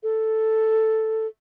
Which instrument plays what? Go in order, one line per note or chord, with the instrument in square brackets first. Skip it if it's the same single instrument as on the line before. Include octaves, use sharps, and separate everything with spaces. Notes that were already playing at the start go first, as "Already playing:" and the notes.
[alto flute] A4